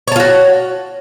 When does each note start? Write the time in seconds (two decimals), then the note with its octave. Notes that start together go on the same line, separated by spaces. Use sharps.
0.08 C#5
0.12 A5
0.16 F4
0.20 F#4